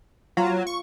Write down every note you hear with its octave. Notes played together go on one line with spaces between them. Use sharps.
F#3 F4
C#6